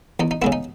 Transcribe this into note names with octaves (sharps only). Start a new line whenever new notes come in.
E2 D#4
D#4
C#3 G#3 B3 E4
D#4